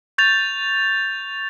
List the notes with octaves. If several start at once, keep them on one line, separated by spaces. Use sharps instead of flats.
C#6 G6 A6 F7